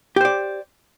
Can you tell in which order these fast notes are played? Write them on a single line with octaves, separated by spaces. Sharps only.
G4 C5 D5